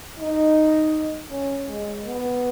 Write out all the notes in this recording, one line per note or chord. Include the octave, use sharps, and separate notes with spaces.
D#4
C#4
G#3
B3